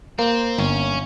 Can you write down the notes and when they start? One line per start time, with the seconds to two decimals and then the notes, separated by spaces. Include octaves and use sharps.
0.18 A#3 C4
0.58 G1 C#4